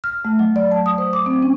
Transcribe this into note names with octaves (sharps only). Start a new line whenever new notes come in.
F6
A3
F#3
D5
A5
D#6
C5
D6
C4
C#4